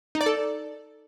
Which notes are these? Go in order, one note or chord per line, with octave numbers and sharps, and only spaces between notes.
D#4
D5
A4